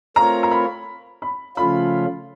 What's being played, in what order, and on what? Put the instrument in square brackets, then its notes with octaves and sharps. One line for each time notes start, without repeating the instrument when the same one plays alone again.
[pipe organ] A3 C4 F4 A#4 C#5 [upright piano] A#5
[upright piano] A#5
B5
B5
[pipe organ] C#3 F3 A3 C#4 F4 [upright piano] B5